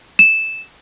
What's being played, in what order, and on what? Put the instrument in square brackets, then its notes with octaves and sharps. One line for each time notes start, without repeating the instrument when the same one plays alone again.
[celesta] E7